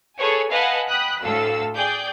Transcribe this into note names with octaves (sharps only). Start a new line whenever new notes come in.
G#4 A4 B4 C#5 G#5
B4 D#5 F5 F#5 G#5 A5
G5 B5 D#6 F#6
D2 A2 A4 F5 E6
G#4 D5 G5 G6